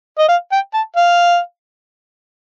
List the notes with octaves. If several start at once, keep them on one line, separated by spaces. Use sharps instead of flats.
D#5
F5
G5
A5
F5